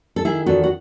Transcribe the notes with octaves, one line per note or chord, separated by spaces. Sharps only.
A4
D#3 E4 G#4
E2 F#4 A4
F#4